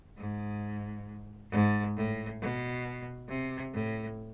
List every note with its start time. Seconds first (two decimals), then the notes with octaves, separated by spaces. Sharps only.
0.18 G#2
1.51 G#2
1.96 A2
2.41 B2
3.28 C3
3.74 A2